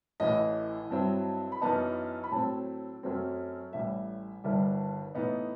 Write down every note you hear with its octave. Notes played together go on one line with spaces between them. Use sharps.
A1 A2 E3 D#5
G2 F#3 C4 E4
B5
F#2 E3 B3 D#4 A5
B5
A2 F#3 C4 A5
F#2 F#3 A3 C4
A1 A2 G3 E5
G1 G2 D#3 G3 E5
A2 E3 B3 D#4